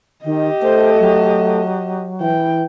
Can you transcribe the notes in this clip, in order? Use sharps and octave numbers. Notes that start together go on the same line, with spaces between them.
D#3 G4 D#5
A3 A4 C5
F#3
E3 G5